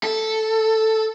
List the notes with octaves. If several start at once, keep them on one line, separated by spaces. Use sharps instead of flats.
A4